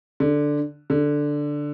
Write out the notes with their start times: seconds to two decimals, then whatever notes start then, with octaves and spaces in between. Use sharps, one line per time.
0.20 D3
0.90 D3